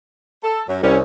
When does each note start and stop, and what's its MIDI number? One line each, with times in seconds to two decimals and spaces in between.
0.43 0.62 69
0.68 0.79 42
0.68 0.79 54
0.83 1.03 36
0.83 0.97 55
0.83 0.97 61